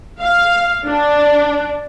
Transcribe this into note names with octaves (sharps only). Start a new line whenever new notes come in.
F5
D4